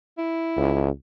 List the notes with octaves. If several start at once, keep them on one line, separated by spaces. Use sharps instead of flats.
E4
C#2